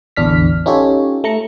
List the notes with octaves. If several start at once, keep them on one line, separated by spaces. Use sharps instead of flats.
A1 E2 D3 D4 F6 B6
C#4 D#4 F4 G4 A4 C#5
A3 A#5 C#7